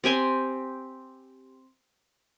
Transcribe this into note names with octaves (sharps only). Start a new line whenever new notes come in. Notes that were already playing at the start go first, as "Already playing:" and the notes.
C4 G4 G#5 C6